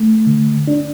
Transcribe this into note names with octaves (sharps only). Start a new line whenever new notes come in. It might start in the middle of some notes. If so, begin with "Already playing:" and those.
Already playing: A3
D3
D4